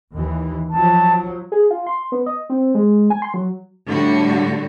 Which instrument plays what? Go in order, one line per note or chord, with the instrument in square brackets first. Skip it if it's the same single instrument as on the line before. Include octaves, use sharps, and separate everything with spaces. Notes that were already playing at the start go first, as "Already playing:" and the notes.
[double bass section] D#2 E3
[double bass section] F3 F#3 [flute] A5
[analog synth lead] G#4
F4
C6
B3
D#5
C4
G#3
G#5
C6
F#3
[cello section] A2 D3 G3 F#4